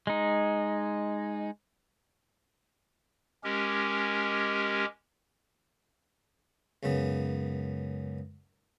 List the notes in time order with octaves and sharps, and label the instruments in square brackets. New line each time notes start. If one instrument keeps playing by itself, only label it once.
[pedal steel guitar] G#3 D#4
[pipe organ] G#3 C#4 G4 A#4
[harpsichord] C#2 F#2 C#3 B3